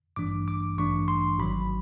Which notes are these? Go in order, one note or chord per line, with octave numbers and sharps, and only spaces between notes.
A1 G2 E3 A3 D4 D6
D6
A1 G2 E3 A3 D4 C#6
C6
G#1 G#2 D#3 F#3 B5